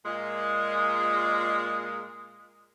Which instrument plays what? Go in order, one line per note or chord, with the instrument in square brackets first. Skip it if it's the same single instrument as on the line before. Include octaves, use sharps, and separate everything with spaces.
[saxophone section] A#2 G#3